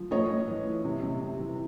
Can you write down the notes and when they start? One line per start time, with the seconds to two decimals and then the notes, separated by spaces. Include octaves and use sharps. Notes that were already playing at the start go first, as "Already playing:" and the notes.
Already playing: F3
0.11 A2 C#5 D#5
0.30 A2
0.48 E3
0.66 E3
0.85 C3
1.03 C3
1.21 C3
1.39 E3